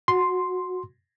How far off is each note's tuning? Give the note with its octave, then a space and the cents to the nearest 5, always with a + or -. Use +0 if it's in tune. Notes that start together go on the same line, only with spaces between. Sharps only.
F#4 -15 C6 +0